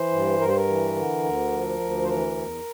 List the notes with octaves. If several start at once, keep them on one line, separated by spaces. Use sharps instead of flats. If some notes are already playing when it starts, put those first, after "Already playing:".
Already playing: E3 C5
G2
G2 A#4
C5
A#4
E3
D3
D2
F3
D2
C5
E3 A#4
E2